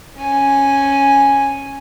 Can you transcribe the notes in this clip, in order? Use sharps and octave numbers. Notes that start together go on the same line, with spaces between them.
C#4 G#5